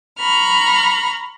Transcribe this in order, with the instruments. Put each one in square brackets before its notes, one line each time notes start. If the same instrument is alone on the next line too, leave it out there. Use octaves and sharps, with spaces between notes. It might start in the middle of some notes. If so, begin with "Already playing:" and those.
[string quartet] A#5 B5 C#6 F6